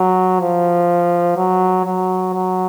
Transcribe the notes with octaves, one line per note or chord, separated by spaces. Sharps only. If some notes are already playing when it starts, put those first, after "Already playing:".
Already playing: F#3
F3
F#3
F#3
F#3